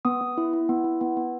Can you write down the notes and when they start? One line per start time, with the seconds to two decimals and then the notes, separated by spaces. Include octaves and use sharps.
0.05 B3 D#6
0.21 B3
0.38 E4
0.53 E4
0.69 B3
0.84 E4
1.01 B3
1.17 B3